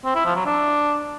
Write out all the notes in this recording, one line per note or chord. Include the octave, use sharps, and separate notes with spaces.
C4
E4
F3
F#3
D4